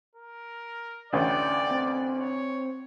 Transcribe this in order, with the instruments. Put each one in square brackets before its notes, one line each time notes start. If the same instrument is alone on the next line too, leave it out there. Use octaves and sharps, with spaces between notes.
[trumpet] A#4
[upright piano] A1 D2 C#4 [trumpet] D5 [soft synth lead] G5
[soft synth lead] C4
[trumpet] C#5